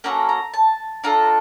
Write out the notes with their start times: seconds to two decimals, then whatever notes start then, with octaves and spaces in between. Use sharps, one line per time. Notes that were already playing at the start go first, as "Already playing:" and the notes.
0.04 A#3 C#4 F#4 A4 A#5
0.29 A#5
0.54 A5
1.04 D4 F4 A4 A#5